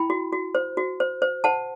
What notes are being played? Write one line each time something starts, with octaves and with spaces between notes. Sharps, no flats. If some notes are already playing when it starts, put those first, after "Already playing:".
Already playing: E4 G5 B5
F#4
F#4
C5
F#4
C5
C5
C5 F#5 A5